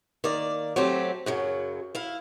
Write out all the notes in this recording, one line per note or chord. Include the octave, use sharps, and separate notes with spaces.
D#3 A#3 D5
F#3 A3 C4 G4
F#2 C#3 F#3
E4 F5